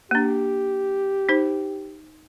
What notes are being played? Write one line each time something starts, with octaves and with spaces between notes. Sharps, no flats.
A#3 D4 G4
D#4 C5